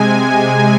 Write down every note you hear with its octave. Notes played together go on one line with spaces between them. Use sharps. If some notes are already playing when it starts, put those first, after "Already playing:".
Already playing: C3 G#3 G#5